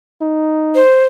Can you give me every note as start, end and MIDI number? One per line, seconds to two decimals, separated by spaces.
0.21 0.82 63
0.75 1.06 72